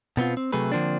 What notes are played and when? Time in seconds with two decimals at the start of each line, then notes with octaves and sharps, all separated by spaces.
0.17 B2 B3 C4 F4
0.37 C4
0.52 C3 F#3 A3 G#4 B4
0.72 D3 F3 A#3 C4 D4